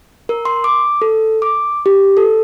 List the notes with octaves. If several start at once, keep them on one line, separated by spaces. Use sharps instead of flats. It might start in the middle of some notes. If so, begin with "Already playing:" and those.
A#4
C6
D6
A4
D6
G4
A4